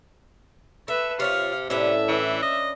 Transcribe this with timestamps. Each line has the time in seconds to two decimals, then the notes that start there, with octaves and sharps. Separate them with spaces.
0.88 A4 B4 E5
1.20 C3 F4 C#5 E5 F5
1.70 A2 C3 C#4 D4 B4 E5
2.09 E3
2.43 D#5